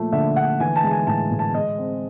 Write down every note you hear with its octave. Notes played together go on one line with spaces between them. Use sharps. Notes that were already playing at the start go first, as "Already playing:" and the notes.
Already playing: A#2 F3 A3
D3 E5
D3 F#5
E3 G#5
A5
G#3
G#5
A2 A5
A2
A5
G#3 D#5
C4